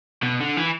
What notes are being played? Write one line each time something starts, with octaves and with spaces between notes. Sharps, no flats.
B2
D3
E3